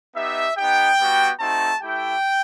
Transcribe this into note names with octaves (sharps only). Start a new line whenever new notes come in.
B3 D#4 G4 E5
B3 D#4 G4 G5
G3 B3 F#4
A3 C4 D#4 F#4 A5
A3 E4 G4 G5